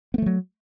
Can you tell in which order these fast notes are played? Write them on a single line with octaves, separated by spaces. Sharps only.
B3 A3 F3 F#3